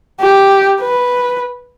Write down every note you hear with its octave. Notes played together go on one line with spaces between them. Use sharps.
G4
B4